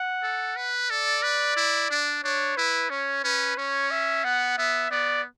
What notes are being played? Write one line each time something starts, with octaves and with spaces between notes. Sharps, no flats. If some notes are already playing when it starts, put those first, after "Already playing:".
Already playing: F#5
A4
B4
A4 D5
B4
E4
D4
D4 C#5
E4 B4
C#4 C#5
C#4 B4
C#4 C#5
E5
B3 F#5
B3 E5
B3 D5